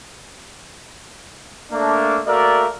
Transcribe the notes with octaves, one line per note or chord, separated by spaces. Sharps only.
A3 A#3 D4
A3 A#3 F#4 A#4 D5 E5